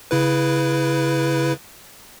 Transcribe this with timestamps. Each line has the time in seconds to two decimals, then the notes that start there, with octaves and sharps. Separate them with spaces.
0.11 C#3 E4 B4